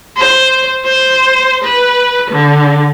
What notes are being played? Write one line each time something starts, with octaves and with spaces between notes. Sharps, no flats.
C5
C5
B4
D3